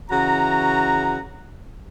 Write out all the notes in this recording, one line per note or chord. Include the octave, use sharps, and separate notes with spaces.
C#3 E3 F#4 A#5